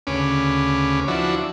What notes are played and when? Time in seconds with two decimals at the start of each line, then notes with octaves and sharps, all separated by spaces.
0.07 D2 C#3 C#4 B4 D6
1.08 F3 D4 E4 F#4